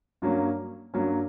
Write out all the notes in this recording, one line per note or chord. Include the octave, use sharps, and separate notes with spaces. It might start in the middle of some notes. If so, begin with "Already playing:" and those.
G2 F#3 A#3 C#4
G2 F#3 A#3 C#4